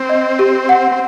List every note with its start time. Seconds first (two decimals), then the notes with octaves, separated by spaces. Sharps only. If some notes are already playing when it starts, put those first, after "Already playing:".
Already playing: C4
0.09 D#5
0.39 G4
0.69 F#5
0.92 C4